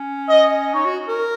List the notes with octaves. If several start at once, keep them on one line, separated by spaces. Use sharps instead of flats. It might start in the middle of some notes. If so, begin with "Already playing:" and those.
Already playing: C#4
D#5
D#4 C#5
F#4
A#4